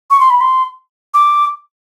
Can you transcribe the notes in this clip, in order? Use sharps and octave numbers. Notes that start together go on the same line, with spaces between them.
C#6
C6
B5
C6
D6